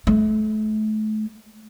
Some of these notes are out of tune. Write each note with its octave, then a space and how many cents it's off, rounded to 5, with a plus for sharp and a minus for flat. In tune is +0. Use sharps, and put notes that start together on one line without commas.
A3 -35